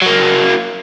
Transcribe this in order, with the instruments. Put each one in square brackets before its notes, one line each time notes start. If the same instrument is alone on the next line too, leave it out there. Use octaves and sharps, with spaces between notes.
[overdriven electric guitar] F#3 A#3